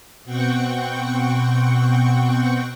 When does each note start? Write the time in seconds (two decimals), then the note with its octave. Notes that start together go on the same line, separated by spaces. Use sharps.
0.25 B2 C4 F#5 G5 C#6